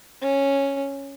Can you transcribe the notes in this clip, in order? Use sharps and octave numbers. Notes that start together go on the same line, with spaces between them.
C#4